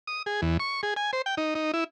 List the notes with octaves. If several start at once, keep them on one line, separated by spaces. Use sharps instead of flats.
D#6
G#4
E2
C#6
G#4
G#5
C5
G5
D#4
D#4
E4